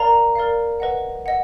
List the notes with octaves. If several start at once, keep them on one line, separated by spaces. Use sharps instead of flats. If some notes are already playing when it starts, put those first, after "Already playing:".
Already playing: A#4 D5 F5 A#5
A#4 D5 F5
B4 D#5 F#5
D#5 F#5